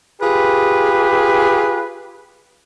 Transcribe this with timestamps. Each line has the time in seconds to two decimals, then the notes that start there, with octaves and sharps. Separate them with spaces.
0.21 F4 G4 G#4 B4